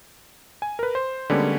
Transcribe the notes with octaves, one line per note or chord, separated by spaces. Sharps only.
G#5
A#4 B4
C5
D3 G3 G#3 A#3 B3 C#4